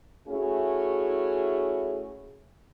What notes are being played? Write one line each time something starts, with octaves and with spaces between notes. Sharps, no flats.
A3 C#4 E4 F#4 G#4